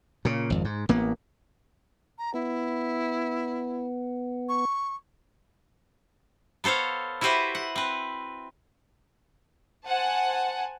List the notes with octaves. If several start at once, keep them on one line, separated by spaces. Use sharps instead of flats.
A#2 C#3
G#1 F2
G#2
A1 A#3 B3
A#5
B3 E4
C#6
B3 A4 C5 C#5 F5
E4 F#4 G4 B4 C5 E5
F#5
C4 B4
C5 F#5 G#5 A5